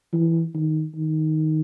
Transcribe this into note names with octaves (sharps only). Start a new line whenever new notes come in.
E3
D#3
D#3